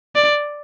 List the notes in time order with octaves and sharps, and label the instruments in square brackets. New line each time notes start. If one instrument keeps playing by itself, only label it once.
[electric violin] D5